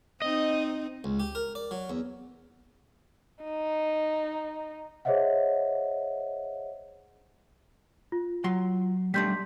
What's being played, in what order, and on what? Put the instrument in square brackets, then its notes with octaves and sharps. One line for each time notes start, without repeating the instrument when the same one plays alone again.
[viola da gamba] C4 D#4 [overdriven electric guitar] D#5
[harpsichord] C#2
G4
A#4
D5
F#3
E2
[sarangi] D#4
[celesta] G#4 C5 C#5 D#5 E5 F#5
F4
[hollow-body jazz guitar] F#3 C6
[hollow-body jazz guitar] G3 A3 D4 [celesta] C6 G6 B6